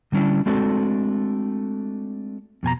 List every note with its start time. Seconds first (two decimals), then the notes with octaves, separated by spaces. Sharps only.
0.12 D3 G3 C#4 D4 E4
0.46 G#3 A3 C4 D4 F#4 A4
2.63 F2 B2 G#5 A#5